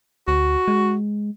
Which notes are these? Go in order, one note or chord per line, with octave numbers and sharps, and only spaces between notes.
D2 F#4
G#3